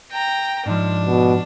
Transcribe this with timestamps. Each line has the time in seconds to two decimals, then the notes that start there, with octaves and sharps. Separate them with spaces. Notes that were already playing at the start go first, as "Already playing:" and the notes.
0.11 G5 A#5
0.66 G#2 F3 D4
1.06 B2